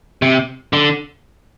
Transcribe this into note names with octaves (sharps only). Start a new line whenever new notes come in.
C3
D3